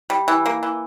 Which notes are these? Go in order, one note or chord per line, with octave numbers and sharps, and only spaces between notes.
G3
E3
A#3
E3